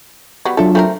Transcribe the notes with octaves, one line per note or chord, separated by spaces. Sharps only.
F#3 G3 B3
F#3 D4 F4 A4 E5
A3 C4 A#4